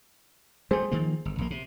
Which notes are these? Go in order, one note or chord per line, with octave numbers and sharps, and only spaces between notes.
G3 A3 G#4 C5
D#3 F3 A#3
G1
A#1 A#3
C3